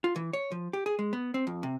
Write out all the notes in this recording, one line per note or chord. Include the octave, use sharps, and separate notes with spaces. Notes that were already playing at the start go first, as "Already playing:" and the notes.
F4
E3
C#5
F3
G4
G#4
G#3
B3
C4
F2
C3